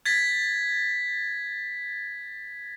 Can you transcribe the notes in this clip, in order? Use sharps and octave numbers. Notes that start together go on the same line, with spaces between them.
G#6 A6 B6